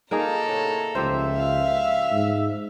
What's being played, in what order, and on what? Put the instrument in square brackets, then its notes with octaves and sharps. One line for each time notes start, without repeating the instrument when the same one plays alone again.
[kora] A#3 D#4 G#4 [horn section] F4 [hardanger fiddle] A4 A#5
[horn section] A2 C3 C#5
[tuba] C#2 [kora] F3 G4 C5 [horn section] E5
[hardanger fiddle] F5
[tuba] G#2